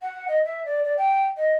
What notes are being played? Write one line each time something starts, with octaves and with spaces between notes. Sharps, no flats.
F#5
D#5
E5
D5
D5
G5
D#5